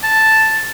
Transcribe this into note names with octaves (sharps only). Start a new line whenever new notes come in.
A5